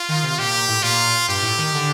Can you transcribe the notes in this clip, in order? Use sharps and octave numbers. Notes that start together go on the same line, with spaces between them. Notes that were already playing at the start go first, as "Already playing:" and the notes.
Already playing: F4
D#3
C3
A#2 G4
A#2
A2
A#2 F4
G2 G4
A2
D#3
D3